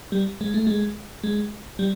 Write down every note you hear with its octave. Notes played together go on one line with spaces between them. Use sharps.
G3
G#3
A3
G#3
G#3
G3